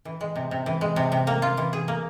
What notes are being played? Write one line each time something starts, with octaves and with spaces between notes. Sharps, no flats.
E3
G#3
C3
C3
E3
G#3
C3
C3
A#3
F4
E3
G#4
A#3